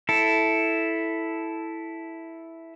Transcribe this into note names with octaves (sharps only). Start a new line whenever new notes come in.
E4 A4